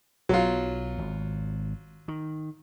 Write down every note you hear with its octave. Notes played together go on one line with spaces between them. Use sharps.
B1 F#3 B3 F4
G#1
D#3